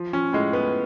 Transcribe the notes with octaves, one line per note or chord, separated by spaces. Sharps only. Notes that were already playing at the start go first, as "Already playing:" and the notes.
Already playing: F3
F3 C#4
A2 G#3
A2 B3